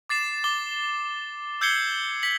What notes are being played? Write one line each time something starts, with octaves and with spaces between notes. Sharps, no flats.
D6 A6 C7 E7
D6 G7
E6 G6 G#6 C7 C#7 G7
B6 F#7